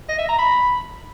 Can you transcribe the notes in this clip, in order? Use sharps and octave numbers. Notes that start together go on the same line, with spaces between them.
D#5
E5
A#5
B5